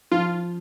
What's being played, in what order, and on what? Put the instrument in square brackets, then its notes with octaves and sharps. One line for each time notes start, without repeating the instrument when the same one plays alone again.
[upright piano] F3 [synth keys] F4